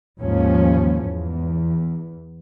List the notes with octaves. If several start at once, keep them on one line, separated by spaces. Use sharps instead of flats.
D#2 G#2 F3 C#4
E2